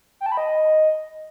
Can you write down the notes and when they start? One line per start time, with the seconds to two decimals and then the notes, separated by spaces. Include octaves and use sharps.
0.21 G5
0.26 A5
0.32 B5
0.37 D#5